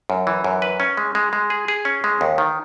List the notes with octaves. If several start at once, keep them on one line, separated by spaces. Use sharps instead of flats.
F#2
E3
F#2
B4
C#4
G#3
G#3
G#3
G#4
G#4
C#4
G#3
D#2
D#3